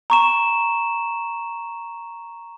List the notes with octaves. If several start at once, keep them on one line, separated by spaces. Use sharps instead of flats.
A#5 C#6 E7